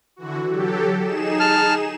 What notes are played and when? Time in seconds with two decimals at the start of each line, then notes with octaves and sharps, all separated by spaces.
0.16 D3 E3 F#4
0.47 F#3 G4 A4
1.02 D#4 G#4 E7
1.40 A5 F6